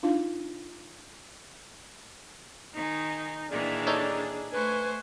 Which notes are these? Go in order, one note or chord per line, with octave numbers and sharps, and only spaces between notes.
D4 D#4 F4 F5
D#3 G#3 D#4
A#2 D#3 E3 D4 G#4 D5
D#4 A4 C#5 D5
A3 B4 C5 G#5 C#6